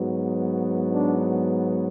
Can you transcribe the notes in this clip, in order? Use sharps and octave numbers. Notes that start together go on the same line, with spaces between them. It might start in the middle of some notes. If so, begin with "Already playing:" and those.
Already playing: G#2 F#3 B3
D4